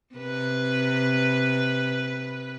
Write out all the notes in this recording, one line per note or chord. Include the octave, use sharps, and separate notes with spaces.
C3 B4